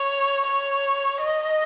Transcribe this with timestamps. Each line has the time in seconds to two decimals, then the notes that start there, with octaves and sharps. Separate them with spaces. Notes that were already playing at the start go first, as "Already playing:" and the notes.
Already playing: C#5
0.46 C#5
1.21 D#5